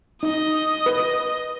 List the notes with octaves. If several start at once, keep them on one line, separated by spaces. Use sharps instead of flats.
D#4 D#5
B4